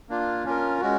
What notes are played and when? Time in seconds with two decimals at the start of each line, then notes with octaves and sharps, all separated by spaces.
0.09 A#3 D4 F4
0.45 C#4 F4 A#4
0.80 G#3 C#4 F#4